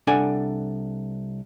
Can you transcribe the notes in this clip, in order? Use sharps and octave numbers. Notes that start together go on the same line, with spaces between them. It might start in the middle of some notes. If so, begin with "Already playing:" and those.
C2 D4 A4 F#5 G#5